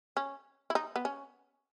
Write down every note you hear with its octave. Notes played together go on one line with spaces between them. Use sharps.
C#4
E4
D#4
B3
C#4